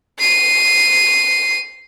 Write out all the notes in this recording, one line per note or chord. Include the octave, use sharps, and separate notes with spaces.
C7 D#7